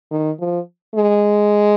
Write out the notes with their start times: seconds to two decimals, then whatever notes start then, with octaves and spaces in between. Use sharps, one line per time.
0.11 D#3
0.40 F3
0.95 G#3